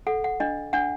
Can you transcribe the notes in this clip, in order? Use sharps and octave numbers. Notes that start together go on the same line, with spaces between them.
A4 F#5
F#5
D4 D#5
D4 F#5